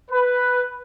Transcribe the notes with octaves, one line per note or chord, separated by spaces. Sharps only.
B4